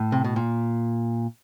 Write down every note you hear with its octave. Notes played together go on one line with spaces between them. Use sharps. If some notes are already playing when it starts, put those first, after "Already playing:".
Already playing: A2
C3
B2
A#2